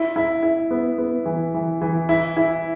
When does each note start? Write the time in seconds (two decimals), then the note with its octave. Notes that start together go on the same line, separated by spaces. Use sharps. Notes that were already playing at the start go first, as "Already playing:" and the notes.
Already playing: E4
0.16 E4
0.43 E4
0.71 B3
0.98 B3
1.25 E3
1.54 E3
1.81 E3
2.09 E4
2.37 E4